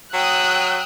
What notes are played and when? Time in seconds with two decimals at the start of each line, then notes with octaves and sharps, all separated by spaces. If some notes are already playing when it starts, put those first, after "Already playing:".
0.14 F#3 G5 D#6 E6 F#6